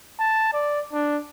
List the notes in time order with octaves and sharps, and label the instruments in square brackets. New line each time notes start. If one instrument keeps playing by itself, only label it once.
[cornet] A5
D5
D4